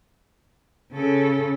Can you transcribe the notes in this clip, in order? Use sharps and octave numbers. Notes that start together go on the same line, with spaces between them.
C#3 A4